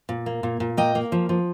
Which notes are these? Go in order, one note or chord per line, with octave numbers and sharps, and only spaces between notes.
A#2
A#3
A#2
A#2
A#3 D#5 G5
A#3
F3
F3